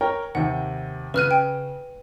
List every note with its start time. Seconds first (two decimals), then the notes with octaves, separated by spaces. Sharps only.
0.01 A#4 C#5 G5
0.35 D#2 C3 F#5
1.14 C#3 B4 F6 F#6 D#7
1.31 G5